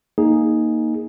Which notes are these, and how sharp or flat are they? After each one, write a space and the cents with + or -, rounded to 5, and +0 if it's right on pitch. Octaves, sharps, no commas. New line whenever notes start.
A#3 +0 D#4 +0 G#4 +0